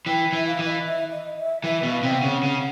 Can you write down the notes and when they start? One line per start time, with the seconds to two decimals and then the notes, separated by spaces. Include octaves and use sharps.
0.06 E3 G5
0.33 E3 E5
0.47 F5
0.59 E3
0.65 D#5
0.86 E5
1.11 D#5
1.38 E5
1.64 E3 E5
1.83 B2
1.90 F5
2.03 C3
2.17 F#5
2.23 C#3
2.43 C#3